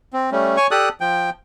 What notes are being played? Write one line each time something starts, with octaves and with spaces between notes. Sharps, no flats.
C4
G3 A3 C#4
C#5 G#5 C#6
G4 A4 D5 D#6 F#6
F3 G5